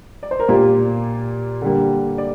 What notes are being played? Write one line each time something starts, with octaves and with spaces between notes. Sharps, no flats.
D5
C5
A#4
A#2 A#3 F4 G4
D3 G3 A#3
D5